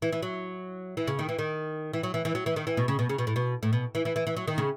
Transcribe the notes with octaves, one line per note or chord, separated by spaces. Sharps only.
E3
E3
F#3
E3
C#3
D#3
E3
D#3
E3
F#3
E3
E3
F#3
E3
D#3
E3
B2
C#3
B2
C#3
B2
A2
B2
A2
B2
E3
E3
E3
E3
F#3
D#3
C#3